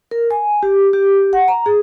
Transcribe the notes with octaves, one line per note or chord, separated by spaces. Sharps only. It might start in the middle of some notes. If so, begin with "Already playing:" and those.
A#4
G#5
G4
G4
F#5
A#5
G#4